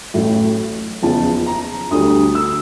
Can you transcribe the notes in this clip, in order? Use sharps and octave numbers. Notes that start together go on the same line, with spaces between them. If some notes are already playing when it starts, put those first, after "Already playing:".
A1 A2 F#3 A3
F#1 E2 C#3 F3 A5
A#5
D2 D3 G3 D#6
E6